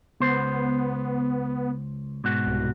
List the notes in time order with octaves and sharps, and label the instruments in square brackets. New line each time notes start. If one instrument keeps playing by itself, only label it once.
[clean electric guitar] C#2 C5 [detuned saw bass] B3
[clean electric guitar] G#2 B2 F#4
[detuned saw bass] C2